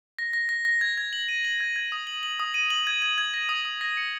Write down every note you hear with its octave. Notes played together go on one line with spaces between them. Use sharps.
A#6
A#6
A#6
A#6
G#6
G#6
F#7
D#7
F#7
G#6
G#6
D#6
F#7
F#7
D#6
D#7
F#7
G#6
G#6
G#6
A#6
D#6
D#6
A#6
C#7